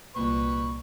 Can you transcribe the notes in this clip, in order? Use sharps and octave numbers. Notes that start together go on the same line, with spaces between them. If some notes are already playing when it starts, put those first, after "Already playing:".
C2 A#2 B4 C#6